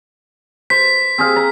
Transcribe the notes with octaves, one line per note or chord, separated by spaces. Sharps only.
C5 B6
C4 G#4 F5
A#5